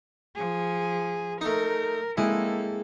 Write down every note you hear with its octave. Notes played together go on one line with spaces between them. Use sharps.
F3 G#4
A3 D#4 A#4
G#3 A#3 C4 E4 G#4 A4